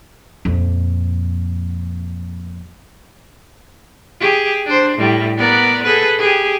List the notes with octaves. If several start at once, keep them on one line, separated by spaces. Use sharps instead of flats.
F2 A#2
G4 G#4
D4 C5
A2 G3
B3 A#4 D5
G#4 A4 B4
G4 G#4